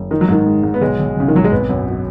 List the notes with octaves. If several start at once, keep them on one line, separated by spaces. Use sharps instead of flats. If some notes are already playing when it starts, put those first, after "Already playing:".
Already playing: F#1
D#3 D#4
F#3
G#2 D#3
G#3
G#2
B3
B1 G#3
B1
B1 C#3
D#3
B1 F#3
G#3
G#1 B3
F#2
F#3